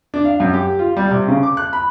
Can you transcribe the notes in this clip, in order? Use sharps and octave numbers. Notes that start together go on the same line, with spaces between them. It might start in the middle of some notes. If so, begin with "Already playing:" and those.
D4
F5
F#2
G4
F4
G3
C3
C#3
D6
F#6
B5